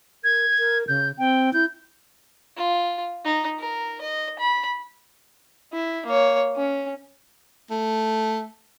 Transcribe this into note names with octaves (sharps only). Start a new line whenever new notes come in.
A#4 G#6
A#4
C#3 G6
C4 G5
E4 G6
F4
D#4
A#4
D#5
B5
E4
A#3 C#5
C#4
A3